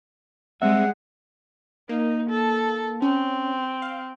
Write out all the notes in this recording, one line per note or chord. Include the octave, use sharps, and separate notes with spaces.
G3 G#3 C4 E5 F#5
A#3 D#4
A4
C4 C#4
F5